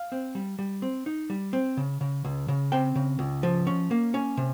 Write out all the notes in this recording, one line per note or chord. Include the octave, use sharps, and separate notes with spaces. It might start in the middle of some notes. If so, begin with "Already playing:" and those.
Already playing: F5
C4
G3
G3
C4
D#4
G3
C4
C#3
C#3
C#2
C#3
C4 G5
C#3
C#2
F3
C#4
A#3
C#4
C3